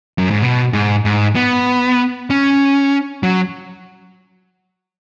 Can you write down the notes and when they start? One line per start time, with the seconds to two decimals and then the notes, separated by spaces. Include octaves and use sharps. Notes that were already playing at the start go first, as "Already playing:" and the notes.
0.18 F#2
0.31 G#2
0.42 B2
0.73 G#2
1.05 G#2
1.35 B3
2.30 C#4
3.23 F#3